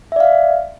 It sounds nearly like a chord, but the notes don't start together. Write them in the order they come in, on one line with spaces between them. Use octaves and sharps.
E5 D5 F5